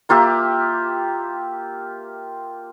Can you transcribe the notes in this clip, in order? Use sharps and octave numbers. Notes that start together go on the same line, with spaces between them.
A#3 F4 G4 E5